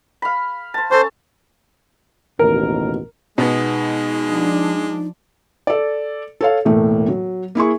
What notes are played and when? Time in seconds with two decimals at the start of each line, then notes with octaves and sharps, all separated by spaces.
0.22 F5 B5
0.74 C5 A5
0.91 C#4 A4 C5 A5
2.39 A1 D#2 B2 A#4
3.38 B2 G#3 B3 D#4
4.24 F3 D4
5.67 A4 D5
6.41 A4 C#5 F5
6.65 E1 A2 A3 A#3
7.08 F#3
7.55 A#3 E4 G#4 C#6